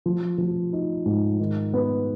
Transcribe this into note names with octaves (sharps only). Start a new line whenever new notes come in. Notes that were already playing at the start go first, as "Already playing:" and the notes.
F3
F3
D#4
G#2
D#3
B3